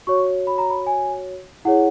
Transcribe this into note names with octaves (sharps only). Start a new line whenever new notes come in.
F#4 C#5 C#6
B5
A#5
B5
G#5
E4 G#4 C#5 F#5